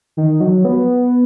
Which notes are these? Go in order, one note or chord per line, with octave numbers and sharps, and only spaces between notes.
D#3
F#3
B3